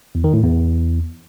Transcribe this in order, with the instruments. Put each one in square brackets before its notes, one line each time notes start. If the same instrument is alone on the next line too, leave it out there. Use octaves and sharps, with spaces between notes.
[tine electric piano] E2
D#3
A2
E2